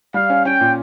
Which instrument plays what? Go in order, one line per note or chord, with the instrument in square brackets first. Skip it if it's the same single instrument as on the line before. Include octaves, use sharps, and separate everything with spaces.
[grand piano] G3 [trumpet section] F5
[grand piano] C#4
[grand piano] C#4 [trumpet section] G5
[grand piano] A#2